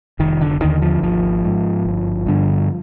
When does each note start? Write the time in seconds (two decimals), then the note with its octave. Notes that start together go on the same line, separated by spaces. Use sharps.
0.19 F1 D#3
0.41 D3
0.61 D#2 D3 D#3
0.82 F3
1.02 G#1 F3
1.44 G#2
1.85 G1
2.27 G2 D3